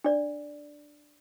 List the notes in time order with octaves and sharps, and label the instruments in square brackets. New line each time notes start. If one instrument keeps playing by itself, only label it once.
[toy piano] D4 D5